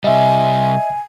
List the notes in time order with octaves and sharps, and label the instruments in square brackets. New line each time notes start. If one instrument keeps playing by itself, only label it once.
[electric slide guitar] C3 G3 [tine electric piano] D#5 E5 [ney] G#5